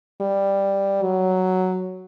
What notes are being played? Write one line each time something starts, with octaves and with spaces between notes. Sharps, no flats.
G3
F#3